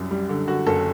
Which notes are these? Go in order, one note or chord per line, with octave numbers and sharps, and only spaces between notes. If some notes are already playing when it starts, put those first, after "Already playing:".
Already playing: C2 F#2
G3
D3
D3 F#4
F#1 A4